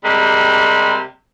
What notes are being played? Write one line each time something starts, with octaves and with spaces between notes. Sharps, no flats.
C3 G3 G#3 A#3